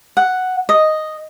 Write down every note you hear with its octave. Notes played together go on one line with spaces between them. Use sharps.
F#5
D#5